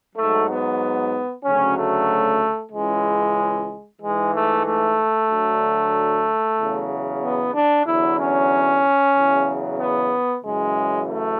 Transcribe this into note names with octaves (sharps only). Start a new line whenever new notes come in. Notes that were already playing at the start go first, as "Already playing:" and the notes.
G#2 F#3 A3
B3
D2 C#3 F#3 C#4
A3
C#2 C#3 E3 G#3
G#2 E3 G#3
A3
A3
D2 D3 F#3
E2 C#3 F#3
B3
D4
E2 D3 F#3 E4
C#4
E2 C#3 F#3
B3
F#2 C#3 E3 G#3
A3